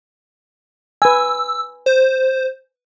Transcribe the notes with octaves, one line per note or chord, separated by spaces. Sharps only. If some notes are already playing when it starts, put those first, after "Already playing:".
B4 G#5 E6
C5